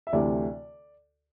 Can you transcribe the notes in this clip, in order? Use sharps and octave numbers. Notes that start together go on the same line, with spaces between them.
E5
D2 C3 E3 A3 D5